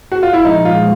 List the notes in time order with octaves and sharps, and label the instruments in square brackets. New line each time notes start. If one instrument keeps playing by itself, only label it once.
[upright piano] F#4
F4
E4
[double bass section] A#2 F3 G#3 [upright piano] D#4
[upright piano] F4